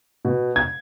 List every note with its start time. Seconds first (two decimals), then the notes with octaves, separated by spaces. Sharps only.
0.25 B2
0.56 G#6